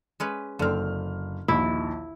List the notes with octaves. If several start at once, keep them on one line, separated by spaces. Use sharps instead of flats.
G#3 C#4 B4
F#1 D3 C4 F6
A#1 D#2 D#3 E4